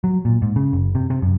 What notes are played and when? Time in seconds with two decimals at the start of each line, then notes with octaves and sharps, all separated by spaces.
0.04 F#3
0.25 A#2
0.42 G#2
0.56 C#3
0.73 F#1
0.95 C3
1.10 C3
1.22 F#2